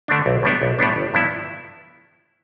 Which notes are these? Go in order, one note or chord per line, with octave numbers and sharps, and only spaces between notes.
D3 A3 D4
B1
A2 G3 B3 D4
B1
A2 G3 B3 D4
G1
G2 F3 B3 E4